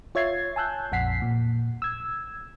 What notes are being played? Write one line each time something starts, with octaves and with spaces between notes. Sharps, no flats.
F4 C#5 E5 G#6 A6 C7
G#5 A5 E6 F#6 G6
A#1 F2 F#5 B6 C7
A#2
E6 G#6